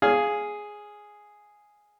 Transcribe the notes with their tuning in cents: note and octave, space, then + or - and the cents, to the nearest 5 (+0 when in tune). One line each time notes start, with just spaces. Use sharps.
G#4 +0 C#5 +30 F5 +0